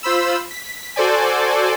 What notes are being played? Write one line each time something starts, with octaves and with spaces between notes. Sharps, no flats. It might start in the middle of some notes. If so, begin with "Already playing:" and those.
F4 C5 B5 E6
B6
F#4 A4 C5 D5 G#5